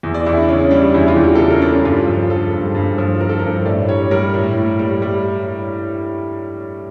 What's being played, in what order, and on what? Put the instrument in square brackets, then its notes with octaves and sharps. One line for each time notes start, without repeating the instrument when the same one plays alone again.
[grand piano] E2
D5
E2 E4
D4
C#3 C#4
G3 D4
E2 E4
F4
E2 G4
A4
C#3 A#4
A#4
C#4
G3 D4
D4
G2 F4
F3
F3 A4
G2
G2
F3
F3 A#4
A4
A#4
G2
A2 D5
G3 C#5
G3 A#4
A2
A2
G3
G3